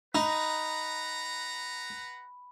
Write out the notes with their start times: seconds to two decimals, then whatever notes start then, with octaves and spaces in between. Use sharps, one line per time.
0.15 D#4 B4 F#5 A#5 B5